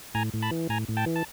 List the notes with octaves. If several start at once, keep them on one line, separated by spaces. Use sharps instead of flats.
A2 G#5 A#5
A2
A5 B5
E3
A2 G#5 A#5
A2
G5 A5
E3
A5